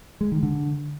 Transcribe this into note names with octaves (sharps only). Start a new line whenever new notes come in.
G#3
D#3
D3